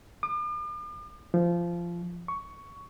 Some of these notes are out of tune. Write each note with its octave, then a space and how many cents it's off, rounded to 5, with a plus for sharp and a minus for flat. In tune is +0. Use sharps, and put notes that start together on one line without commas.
D6 +45
F3 -20
C#6 +10